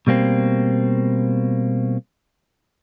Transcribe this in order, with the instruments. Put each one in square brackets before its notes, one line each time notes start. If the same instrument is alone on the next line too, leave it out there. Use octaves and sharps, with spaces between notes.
[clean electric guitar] B2 G3 A#3 C4